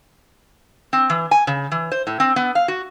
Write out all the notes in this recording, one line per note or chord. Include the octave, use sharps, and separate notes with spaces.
C4
E3
G#5
C#3
E3
C5
A2
C4
B3
F5
F#4